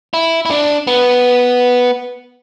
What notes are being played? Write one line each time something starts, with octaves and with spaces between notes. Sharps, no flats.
E4
E4
D4
B3